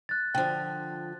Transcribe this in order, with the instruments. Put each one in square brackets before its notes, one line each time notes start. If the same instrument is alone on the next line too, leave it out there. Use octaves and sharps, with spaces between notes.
[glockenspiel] F#6 A6
[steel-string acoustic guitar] D3 F3 [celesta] G5